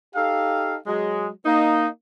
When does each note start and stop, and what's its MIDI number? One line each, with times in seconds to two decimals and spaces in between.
0.15 0.76 63
0.15 0.76 67
0.15 0.76 69
0.15 0.76 77
0.87 1.27 54
0.87 1.27 56
1.46 1.87 58
1.46 1.87 63